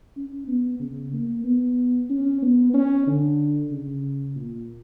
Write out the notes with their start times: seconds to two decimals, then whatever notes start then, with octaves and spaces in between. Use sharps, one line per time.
0.16 C#4
0.47 B3
0.80 C#3
1.13 A#3
1.44 B3
2.10 C#4
2.42 B3
2.74 C#4
3.07 D3
3.71 C#3
4.36 A#2